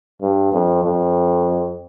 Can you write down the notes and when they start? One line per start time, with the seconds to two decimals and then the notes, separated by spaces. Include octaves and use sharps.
0.22 G2
0.54 F2
0.84 F2